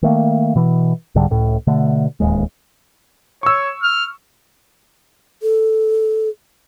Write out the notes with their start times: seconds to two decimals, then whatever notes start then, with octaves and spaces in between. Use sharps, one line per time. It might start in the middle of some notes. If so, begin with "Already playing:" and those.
0.03 D#3 A3 A#3
0.56 B2 E3
1.15 C2 G#2 D3 G3
1.30 C#2 A2
1.67 B2 D3 A3
2.20 D1 D#2 G#3
3.43 C#5 C#6 E6
3.83 F6
5.43 A4